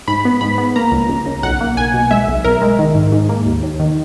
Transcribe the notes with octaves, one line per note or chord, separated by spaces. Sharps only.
G#2 B5
B3
G#2 B5
B3
A#3 A#5
C#2
C#2
C#2
B1 F#5
A#3
B1 G#5
B2
G#3 E5
B1
B1 A#4
G#3
D#3
G#2
G#2
A#3
D#2
D#2
D#3